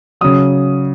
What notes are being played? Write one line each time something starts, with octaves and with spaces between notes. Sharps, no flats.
C#3 F#3 D#6